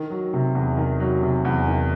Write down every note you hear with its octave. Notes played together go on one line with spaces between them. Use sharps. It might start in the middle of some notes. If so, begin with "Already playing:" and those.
Already playing: D#3
F#3
C3
E2
D#3
F#3
C3
E2
D#3